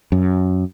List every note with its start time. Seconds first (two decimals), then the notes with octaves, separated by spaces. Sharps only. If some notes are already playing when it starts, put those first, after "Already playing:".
0.12 F#2